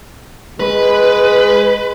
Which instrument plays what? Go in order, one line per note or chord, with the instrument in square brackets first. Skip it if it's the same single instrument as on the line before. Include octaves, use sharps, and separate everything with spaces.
[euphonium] G#3 [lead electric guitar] B4